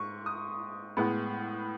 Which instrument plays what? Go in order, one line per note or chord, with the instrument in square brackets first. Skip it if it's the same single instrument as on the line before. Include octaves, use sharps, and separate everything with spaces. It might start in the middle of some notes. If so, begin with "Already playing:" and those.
Already playing: [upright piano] G#2 C#6
D#6
A2 G#3 B3